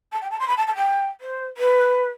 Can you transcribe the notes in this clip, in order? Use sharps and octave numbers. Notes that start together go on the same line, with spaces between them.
A5
G5
A5
C6
B5
A5
A5
G5
C5
B4